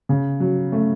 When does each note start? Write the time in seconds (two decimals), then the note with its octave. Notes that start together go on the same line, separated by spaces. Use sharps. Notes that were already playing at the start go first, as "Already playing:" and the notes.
0.09 C#3
0.40 F#3
0.72 A3